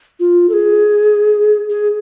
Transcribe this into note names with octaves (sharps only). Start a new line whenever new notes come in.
F4
A4
G#4
G#4